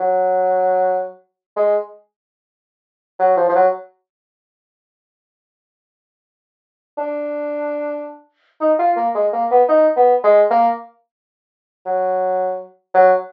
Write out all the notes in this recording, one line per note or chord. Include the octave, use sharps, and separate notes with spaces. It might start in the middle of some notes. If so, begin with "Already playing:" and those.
Already playing: F#3
G#3
F#3
F3
F3
F#3
D4
D#4
F4
A#3
G#3
A#3
B3
D#4
B3
G#3
A#3
F#3
F#3